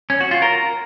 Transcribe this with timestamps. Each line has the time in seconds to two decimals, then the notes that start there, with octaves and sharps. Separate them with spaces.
0.10 C#4
0.21 F#4
0.31 F4
0.42 A#4